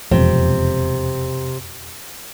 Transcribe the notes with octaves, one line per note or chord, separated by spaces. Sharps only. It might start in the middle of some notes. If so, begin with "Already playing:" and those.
E1 F2 C3